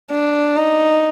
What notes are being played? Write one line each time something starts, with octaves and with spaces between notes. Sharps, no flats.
D4
D#4